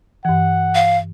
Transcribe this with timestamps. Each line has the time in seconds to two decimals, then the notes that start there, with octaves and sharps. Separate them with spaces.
0.25 G2 E3 F#5
0.75 F5